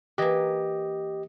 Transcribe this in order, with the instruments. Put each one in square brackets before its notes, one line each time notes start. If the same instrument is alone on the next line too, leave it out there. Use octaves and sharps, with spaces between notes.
[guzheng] E3 A#3 [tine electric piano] G4 D#5